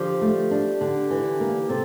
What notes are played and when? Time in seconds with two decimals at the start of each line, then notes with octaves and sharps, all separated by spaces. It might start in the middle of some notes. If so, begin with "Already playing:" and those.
Already playing: D3 F3 G4
0.21 A3
0.51 D4
0.81 D3
1.11 E3
1.40 A#3
1.69 C3 A4